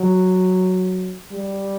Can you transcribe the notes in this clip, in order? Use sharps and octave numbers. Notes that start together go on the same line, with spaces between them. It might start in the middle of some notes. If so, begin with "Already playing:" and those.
Already playing: F#3
G3